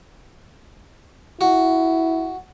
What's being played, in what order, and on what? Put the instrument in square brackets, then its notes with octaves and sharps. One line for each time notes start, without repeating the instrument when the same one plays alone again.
[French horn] E4 [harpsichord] F#4